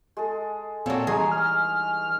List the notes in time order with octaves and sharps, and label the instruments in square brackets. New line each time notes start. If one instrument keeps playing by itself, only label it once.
[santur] G#3 A4
[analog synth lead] A#2 [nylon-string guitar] C4 C#5 D5 [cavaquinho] F#4 A4
[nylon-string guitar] E3 G3 D#4 [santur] G#3 C#6 [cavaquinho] G#4 G#5 [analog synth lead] A#5
[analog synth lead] F6